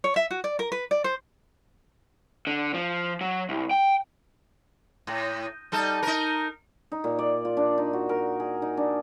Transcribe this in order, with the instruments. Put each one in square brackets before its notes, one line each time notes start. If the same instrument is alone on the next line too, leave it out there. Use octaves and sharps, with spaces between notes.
[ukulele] C#5
E5
F#4
D5
A#4
B4
D5
C5
[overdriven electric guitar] D3
F3
F#3
C2
G5
[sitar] A2
G3 D#4 A4
D#4 A#4
[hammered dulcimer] D#4
A#2
D5
F4
D4
D#4
F#4
A#4
G#4
D#4
D4